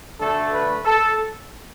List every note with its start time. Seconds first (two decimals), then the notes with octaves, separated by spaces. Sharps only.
0.19 D2 D3 A3 A4
0.52 B4
0.86 A4